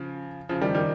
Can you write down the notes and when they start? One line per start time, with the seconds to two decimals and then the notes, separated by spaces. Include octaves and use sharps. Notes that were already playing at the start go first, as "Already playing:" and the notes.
Already playing: C#3 F3
0.49 C#3 F3
0.61 D#3 G3
0.75 D#3 G3